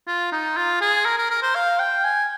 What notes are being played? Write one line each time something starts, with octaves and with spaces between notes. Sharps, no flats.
F4
D#4
F4
G#4
A#4
A#4
A#4
C5
F5
G5
G#5